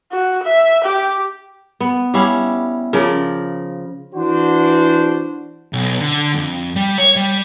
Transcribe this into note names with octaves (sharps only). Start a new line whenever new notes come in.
F#4
E5
G4
B3
G3 C#4 E4 F5
C#3 F3 A#4 D5
E3 D4 F#4 C5
B1
D3
F2
G3
C#5
G3